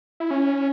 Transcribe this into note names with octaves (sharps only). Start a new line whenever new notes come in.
E4
C#4